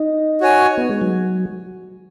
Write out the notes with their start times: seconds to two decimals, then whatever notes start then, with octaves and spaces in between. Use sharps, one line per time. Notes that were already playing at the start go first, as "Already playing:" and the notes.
Already playing: D#4
0.41 F#4 C#5 G#5
0.78 B3
0.89 G#3
1.01 F#3